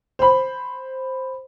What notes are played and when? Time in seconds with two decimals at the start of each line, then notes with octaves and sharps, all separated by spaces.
0.19 C5 B5